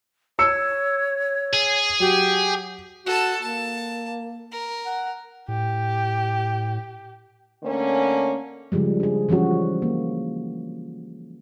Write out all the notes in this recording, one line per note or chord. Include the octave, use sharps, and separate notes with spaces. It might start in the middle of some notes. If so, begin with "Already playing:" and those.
C#5 E6 C#7
G#4
F#3 G4
F#4 A4 A5
A#3 A5
A#4
F#5
A2 G4
D3 A3 A#3 C#4
C#3 F3 G3 G#3
D4 G#4
E3 F3 G3 C#4 F#4
A#3